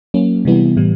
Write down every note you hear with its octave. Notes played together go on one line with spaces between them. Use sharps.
F#3 A#3 C#4
C3 E3 G3 B3 E4
A2 E3 G3